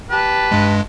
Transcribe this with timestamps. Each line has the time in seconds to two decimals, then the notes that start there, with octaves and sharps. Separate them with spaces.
0.10 G4 B4 A5
0.52 G2 G#3